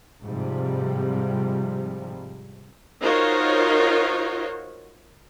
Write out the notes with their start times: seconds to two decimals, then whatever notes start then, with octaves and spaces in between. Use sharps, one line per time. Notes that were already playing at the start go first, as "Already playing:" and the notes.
0.24 G#2 C3 F3 G3
3.02 D#4 F4 F#4 A#4 C5 C#5